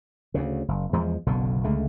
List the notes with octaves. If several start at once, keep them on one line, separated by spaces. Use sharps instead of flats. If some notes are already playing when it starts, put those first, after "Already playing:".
D2 C#3
F#1
E2 F3 G#3
F#1 B1 B2 D3
C#2 D3 G#3 A3